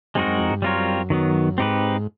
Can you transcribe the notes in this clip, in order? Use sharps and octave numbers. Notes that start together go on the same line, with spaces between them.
F#2 G#3 C4 D#4 F#4 A#4
F#2
F2
G2
F#2 G3 C4 F4 A#4 C#5
D#3 F#3 B3
G#2 C4 D#4 G4 B4